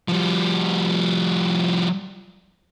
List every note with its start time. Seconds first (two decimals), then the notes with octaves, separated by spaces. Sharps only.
0.08 F3 G3